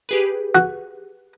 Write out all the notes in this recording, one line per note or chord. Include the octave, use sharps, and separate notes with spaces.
G4 G#4 B4
F#4